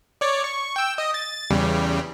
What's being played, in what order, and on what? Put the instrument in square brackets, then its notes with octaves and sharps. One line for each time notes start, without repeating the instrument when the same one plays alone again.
[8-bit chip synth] C#5 D5
C#6
G5 E6
D#5
A6
E2 C#3 G3